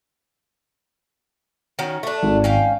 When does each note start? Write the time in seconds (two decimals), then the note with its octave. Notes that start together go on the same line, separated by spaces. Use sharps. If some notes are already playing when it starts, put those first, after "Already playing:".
1.79 D#3 C#4 F#4
2.03 A3 D4
2.23 G#1
2.44 C#4 F5 G5